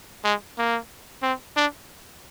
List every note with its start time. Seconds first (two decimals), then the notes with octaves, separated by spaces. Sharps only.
0.24 G#3
0.58 A#3
1.23 C4
1.56 D4